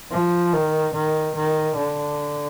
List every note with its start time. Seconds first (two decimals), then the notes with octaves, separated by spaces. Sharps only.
0.11 F3
0.53 D#3
0.94 D#3
1.36 D#3
1.77 D3